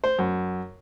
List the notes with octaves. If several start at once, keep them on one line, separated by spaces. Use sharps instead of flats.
C5
F#2